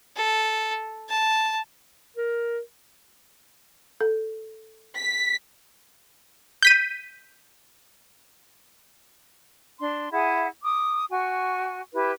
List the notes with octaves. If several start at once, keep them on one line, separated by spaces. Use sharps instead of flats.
A4
A5
A#4
A4
B6
G6 B6 D#7
D4 C6
E4 G#4 E5 F#5
D6 D#6
F#4 G#5 C#6
E4 G4 B4